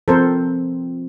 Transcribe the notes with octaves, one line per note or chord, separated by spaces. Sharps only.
F3 C4 A4 A#4 C5